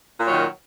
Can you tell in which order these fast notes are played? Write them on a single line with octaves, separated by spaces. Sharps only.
A#2 F#3 D#3